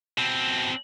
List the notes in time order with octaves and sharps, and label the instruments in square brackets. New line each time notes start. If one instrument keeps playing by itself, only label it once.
[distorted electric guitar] B2 C4